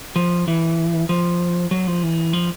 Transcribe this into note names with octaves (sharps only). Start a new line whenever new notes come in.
F3
E3
F3
F#3
F3
E3
F3